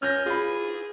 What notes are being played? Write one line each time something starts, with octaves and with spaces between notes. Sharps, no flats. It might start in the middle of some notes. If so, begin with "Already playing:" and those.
C#4 F6 G6 A#6
F4 G#4 B5